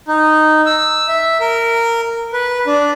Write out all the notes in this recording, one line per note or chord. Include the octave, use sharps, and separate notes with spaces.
D#4
E6
E5
A#4
B4
D4